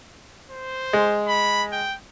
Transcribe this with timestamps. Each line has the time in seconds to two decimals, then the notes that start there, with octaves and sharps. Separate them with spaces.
0.50 C5
0.93 G#3
1.28 B5
1.72 G5